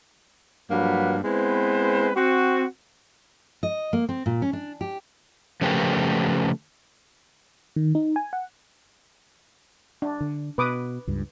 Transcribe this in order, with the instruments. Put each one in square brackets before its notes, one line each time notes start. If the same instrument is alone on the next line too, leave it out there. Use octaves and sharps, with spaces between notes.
[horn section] G2 F3 F#3 A#3 B4 F#5
G#3 B3 C4 E4 B4 C5
C4 F#4
[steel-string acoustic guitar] D#5
A#3
C4
A#2
C#4
D4
G4
[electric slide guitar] C#3 F3 A3 G4 A#4 B4
[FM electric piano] D#3
D#4
G#5
F#5
[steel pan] D4
[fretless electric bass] D3
[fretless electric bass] B2 [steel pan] B4 D6 D#6
[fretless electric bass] C#2 G2